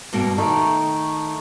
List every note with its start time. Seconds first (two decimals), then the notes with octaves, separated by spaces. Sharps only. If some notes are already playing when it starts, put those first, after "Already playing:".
0.13 G2 B2 A#3
0.38 D#3 A3 D#4 G5